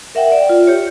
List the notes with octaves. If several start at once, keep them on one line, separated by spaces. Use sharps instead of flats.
A#4 E5 F#5 G5
D5
F4
G4 C#5